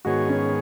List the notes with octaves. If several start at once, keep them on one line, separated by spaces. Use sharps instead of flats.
G#2 D#3 B3 F#4 G#4 C#5
C#4